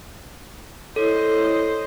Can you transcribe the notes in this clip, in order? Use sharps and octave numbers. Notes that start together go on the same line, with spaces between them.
E4 A4 C5 C#5 D#5